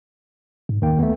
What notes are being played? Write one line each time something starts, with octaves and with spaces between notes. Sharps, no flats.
G#2
D#2 D#3 A#3 G5
D#2 A3 B3